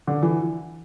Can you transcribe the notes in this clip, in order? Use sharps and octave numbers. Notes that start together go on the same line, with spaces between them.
D3
E3